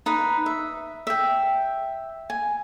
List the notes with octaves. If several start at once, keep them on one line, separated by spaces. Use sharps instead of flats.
D#4 B4
E5
E5 G5
G#5